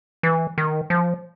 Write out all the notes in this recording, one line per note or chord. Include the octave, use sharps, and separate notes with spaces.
E3
D#3
F3